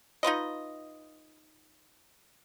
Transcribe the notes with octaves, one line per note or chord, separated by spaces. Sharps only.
D#4 F4 B4 D#5